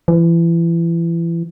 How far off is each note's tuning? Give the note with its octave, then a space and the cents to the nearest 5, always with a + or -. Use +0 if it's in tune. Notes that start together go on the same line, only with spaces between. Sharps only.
E3 +30